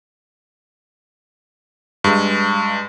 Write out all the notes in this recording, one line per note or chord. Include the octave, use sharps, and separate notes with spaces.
G2 G#3